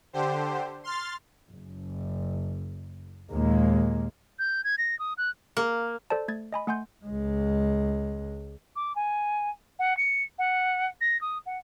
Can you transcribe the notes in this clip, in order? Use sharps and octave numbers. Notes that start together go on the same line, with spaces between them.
D3 G4 C5
C6 F6 A6
F#1
D#2 A#2 G#3 A#3
G6
G#6
A#6
D#6
F#6
A#3
A4 C5 D5 A5
A3 G#6 A6
D#5 G#5 B5
A3 F#5 G#5 C6 G6
C#2 G#3
D6
G#5
F#5
C#7
F#5
A#6
D#6
F#5